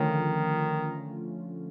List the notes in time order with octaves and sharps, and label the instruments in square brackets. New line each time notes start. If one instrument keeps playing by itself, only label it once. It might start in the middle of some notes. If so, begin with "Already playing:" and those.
Already playing: [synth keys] D3 F3 A3 C#4 F4 [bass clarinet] D#3